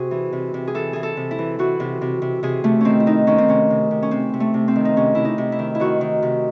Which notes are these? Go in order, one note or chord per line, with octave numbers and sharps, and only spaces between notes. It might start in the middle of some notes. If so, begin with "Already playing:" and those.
Already playing: C3 F#4 G#4 C5
E3
C3
C3
G#4
E3 A4
E3 G#4
A4
C3
E4
E3
E3 F#4
C3
C3
C3
C3 G#4
C3 A3
D#3 C4 C#4
E4
D#3 D#4
D#3 C#4
C4
C3 C#4
C3
C3
C#4
C3 C4
C3
A3
C3
C4
D#3
D#4
C3 C#4
C3 E4
D#4
C3
E4
D#3
E4
D#3 F#4
D#3
C3